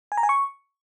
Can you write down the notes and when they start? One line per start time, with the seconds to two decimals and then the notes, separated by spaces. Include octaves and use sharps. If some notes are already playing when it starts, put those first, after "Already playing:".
0.12 G#5
0.17 A#5
0.23 G#5
0.29 C#6